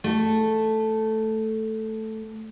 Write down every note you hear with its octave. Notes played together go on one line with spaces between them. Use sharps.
A3 A4